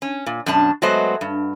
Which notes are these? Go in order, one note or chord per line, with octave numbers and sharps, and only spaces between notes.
C#4
A#2
F#2 B2 D4 A5
F#3 G#3 A3 B3 C5 D#5
G2